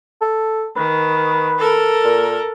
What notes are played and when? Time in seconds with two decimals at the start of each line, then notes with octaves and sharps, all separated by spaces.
0.21 A4
0.76 D#3 B4
1.59 A4 A#4
2.04 A#2